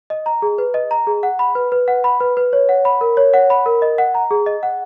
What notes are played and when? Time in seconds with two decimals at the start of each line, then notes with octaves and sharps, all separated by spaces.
0.10 D#5
0.26 A#5
0.42 G#4
0.58 B4
0.74 D#5
0.91 A#5
1.07 G#4
1.23 F#5
1.39 B5
1.55 B4
1.72 B4
1.88 F#5
2.04 B5
2.20 B4
2.37 B4
2.53 C#5
2.69 F#5
2.85 B5
3.01 A#4
3.17 C#5
3.33 F#5
3.50 B5
3.66 A#4
3.82 D#5
3.98 F#5
4.15 A#5
4.31 G#4
4.46 D#5
4.63 F#5